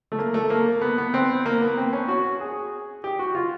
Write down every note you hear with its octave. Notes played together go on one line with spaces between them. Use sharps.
A3
A#3
A3
A#3
B3
B3
C4
A#3
B3
C4
C#4
F#4
G#4
G4
F#4
F4